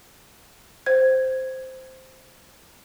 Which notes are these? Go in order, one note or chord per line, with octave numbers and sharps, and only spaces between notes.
C5 G#6